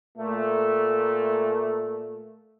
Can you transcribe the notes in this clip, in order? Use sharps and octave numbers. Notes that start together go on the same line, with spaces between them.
A#2 A3